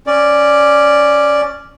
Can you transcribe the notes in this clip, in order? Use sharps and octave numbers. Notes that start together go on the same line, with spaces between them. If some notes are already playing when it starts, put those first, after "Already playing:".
C#4 D5